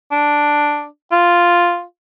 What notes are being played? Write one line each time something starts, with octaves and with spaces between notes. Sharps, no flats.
D4
F4